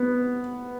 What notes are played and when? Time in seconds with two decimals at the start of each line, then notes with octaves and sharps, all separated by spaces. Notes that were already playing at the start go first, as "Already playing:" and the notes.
Already playing: B3